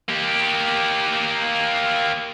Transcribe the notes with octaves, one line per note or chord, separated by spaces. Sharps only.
A#3 G4